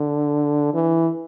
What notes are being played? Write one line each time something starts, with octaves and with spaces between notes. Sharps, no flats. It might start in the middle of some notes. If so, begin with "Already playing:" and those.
Already playing: D3
E3